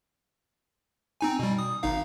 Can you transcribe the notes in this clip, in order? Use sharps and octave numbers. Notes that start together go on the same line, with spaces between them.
C4 D#4 G#5
B2 G3
D#6
G#1 D#4 F5